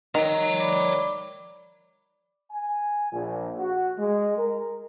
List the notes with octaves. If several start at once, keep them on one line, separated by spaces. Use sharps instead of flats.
D#3 C#5 A#5
D5 B5 D6
G#5
A#1
F#4
G#3
A#4